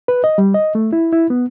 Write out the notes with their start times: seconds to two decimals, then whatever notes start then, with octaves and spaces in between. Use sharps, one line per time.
0.08 B4
0.24 D#5
0.38 G3
0.54 D#5
0.75 A3
0.93 E4
1.12 E4
1.30 B3